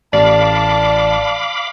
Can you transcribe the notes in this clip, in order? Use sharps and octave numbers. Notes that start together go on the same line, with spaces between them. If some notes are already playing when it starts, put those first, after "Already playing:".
A1 D5 F5 A5 B5 D6